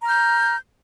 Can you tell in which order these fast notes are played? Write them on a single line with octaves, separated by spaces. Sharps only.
A#5 F6 G6